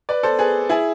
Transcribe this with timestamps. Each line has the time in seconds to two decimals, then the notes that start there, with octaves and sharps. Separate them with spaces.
0.09 B4 D5
0.23 A4 C5
0.39 G#4 B4
0.69 E4 G#4